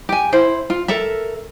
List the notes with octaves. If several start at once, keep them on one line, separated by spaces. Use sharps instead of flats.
G4 G#5
E4 C5
F4
A4 A#4 E5